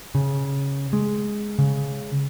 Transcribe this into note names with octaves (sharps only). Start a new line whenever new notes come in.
C#3
G#3
C#3